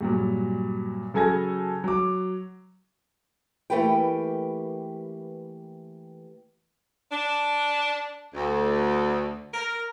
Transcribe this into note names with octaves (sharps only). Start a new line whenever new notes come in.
G2 A#2 F#3
C#3 F#3 A4 G#5 G#6 A#6
F#3 D6
E3 A3 A#3 G4 B4 G5
D4
D2
A#4